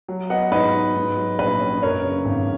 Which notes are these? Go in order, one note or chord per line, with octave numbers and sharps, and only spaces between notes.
F#3
B3 D#5 F#5
G#2 B4 D#5
D#4
G#2
F#3
A#1 B4
C#4
F#2 A#4 C#5
C#3
G#1